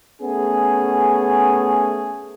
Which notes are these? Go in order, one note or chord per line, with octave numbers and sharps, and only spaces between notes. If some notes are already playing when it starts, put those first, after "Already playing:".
A3 B3 C#4 G#4